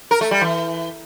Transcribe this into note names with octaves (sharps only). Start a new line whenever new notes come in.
A#4
A3
G3
E3